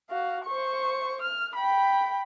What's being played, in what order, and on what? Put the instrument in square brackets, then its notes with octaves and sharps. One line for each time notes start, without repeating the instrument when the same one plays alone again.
[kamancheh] F#4 F5
C5 C#6
F6
G5 B5